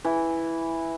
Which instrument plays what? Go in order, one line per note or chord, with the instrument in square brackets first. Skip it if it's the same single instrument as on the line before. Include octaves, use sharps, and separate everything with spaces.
[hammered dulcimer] E3